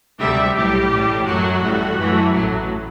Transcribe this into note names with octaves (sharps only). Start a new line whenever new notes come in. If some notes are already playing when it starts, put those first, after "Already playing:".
D2 C3 G3 E5
B1 A2 G3 G4
A1 A2 G3
F#2 F#3 A3 F#4
A1 A2 G3
F#2 E3 A3
A1 A2 F#3 A3